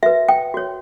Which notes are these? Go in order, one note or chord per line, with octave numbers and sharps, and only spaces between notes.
F#4 B4 E5
G5
F#4 C#5